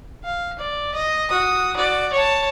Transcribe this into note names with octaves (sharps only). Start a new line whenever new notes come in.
F5
D5
D#5
F#4 D#6
F#4 D5
C#5 A5